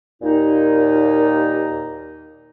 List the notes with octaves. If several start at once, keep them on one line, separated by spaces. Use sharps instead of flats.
D#2 A#2 D#4